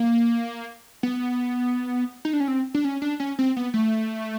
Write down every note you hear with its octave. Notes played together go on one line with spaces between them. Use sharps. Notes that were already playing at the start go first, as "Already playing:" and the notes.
Already playing: A#3
B3
D#4
D4
C#4
C4
D4
C#4
D4
C#4
C4
B3
A3